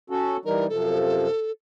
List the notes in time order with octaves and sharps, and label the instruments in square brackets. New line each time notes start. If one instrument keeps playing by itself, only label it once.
[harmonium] C#4 F#4 A4
[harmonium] E3 G3 D#4 [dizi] A#4
[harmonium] F#2 C3 F3 [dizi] A4